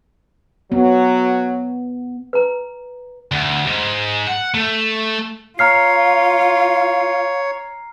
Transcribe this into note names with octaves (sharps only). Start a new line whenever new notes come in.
F#3 B3
B4 A#5
D2
G#2
F#5
A3
F4 C#5 F5 A#5 F6 C7